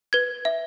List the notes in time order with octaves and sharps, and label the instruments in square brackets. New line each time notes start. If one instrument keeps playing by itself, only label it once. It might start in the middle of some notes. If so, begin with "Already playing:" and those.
[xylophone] B4 G#6
E5